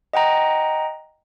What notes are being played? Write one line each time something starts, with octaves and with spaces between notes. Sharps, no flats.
D#5 F#5 G5 A#5